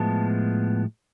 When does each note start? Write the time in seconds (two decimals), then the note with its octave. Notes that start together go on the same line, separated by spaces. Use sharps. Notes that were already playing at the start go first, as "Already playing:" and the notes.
Already playing: A2 F3 G#3 B3 A5